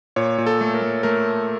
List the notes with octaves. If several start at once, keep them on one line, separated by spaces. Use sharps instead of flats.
A#2 C#5
A#2
A4
A3
A#4
A3
A3 A#4